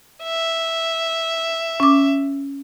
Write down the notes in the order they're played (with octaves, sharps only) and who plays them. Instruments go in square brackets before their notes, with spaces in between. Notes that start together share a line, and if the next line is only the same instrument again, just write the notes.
[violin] E5
[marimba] C#4 D6